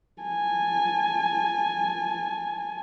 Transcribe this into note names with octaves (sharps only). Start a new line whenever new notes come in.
G#5 A5